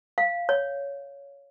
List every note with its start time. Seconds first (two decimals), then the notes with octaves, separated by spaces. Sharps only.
0.18 F5
0.49 C#5